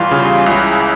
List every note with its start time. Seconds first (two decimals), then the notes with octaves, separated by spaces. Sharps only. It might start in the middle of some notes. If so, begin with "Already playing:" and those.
Already playing: E2 E3 G3 F4
0.11 C#3
0.46 C#2 E4